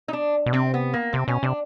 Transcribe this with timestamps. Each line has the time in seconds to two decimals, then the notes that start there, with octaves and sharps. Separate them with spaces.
0.08 D#4
0.13 D4
0.46 B2
0.53 C3 C4
0.74 B3
0.94 A#3
1.13 C3 C4
1.28 B2 C#4
1.43 C3 D4